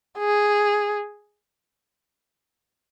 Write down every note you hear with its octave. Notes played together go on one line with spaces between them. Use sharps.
G#4